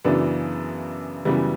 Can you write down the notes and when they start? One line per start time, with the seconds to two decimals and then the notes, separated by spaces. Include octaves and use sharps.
0.05 F#2 C#3 E3 B3 D4
1.25 F#2 C#3 E3 G3 B3